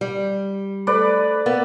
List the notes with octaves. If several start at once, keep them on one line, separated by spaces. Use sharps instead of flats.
G3
A3 A4 B4 C5 D5
B3 A#4 F5 A6